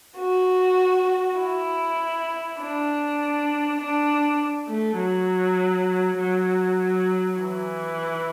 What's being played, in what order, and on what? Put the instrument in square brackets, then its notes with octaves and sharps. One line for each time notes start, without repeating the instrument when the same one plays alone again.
[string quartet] F#4
E4
D4
D4
A3
F#3
F#3
E3